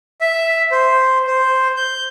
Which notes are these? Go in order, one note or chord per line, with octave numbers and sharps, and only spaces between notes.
E5
C5
C5
G6